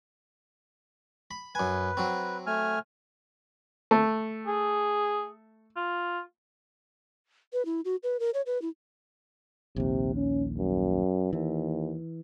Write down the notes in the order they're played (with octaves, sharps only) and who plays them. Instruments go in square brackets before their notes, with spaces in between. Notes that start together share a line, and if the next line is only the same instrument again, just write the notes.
[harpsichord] B5
[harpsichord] F#2 G#5 [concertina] B4
[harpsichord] F#3 C4
[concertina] A3 G#5 F6
[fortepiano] A3
[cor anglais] G#4
F4
[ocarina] B4
E4
F#4
B4
A#4
C#5
B4
E4
[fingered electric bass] A#1 D#2 [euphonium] C3
[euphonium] C#4
F#2
[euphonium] D#2 [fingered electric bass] E3